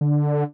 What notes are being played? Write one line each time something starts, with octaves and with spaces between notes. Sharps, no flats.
D3